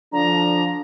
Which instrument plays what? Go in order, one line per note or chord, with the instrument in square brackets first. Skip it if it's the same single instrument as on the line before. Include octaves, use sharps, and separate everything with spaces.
[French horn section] D3 F3 D4 [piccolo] A#5